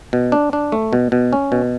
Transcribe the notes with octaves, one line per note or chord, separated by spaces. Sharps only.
B2
D4
D4
A3
B2
B2
C#4
B2